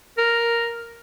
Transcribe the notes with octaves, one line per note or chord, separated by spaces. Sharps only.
A#4